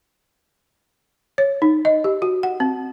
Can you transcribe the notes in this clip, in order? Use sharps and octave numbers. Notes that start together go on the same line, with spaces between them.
C#5
D#4
D#5
G4
F#4
F#5
C4